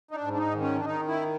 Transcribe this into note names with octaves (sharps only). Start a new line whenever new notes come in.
D#4
D4
G#2
D4
D#4
D#3
C#4
D4
D#3 D#4
E4